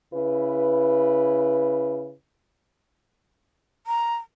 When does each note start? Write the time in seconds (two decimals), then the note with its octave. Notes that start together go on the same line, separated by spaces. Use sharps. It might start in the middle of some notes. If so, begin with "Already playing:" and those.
0.14 C#3 E4 B4
3.87 A#5